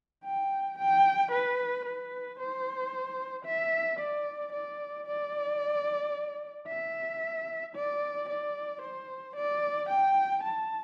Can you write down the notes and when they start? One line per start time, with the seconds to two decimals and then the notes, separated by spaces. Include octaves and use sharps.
0.25 G5
0.78 G5
1.32 B4
1.85 B4
2.39 C5
3.45 E5
3.99 D5
4.53 D5
5.07 D5
6.68 E5
7.76 D5
8.29 D5
8.82 C5
9.36 D5
9.89 G5
10.44 A5